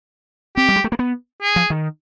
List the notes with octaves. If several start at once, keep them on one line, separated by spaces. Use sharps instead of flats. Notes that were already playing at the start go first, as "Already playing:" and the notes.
C4 G4
G3
G#3
A3
A#3
B3
G#4
F3
D#3